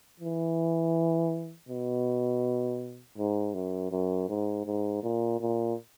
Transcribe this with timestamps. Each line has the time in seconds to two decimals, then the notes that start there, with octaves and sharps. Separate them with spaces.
0.20 E3
1.69 B2
3.18 G#2
3.54 F#2
3.91 F#2
4.29 G#2
4.66 G#2
5.03 A#2
5.41 A#2